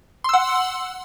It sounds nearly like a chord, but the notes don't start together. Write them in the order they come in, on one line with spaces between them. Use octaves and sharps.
C6 E6 F#5